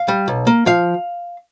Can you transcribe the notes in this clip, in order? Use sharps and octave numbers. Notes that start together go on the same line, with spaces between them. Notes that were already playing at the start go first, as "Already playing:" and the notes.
Already playing: F5
G3
B1
A#3
F3 F5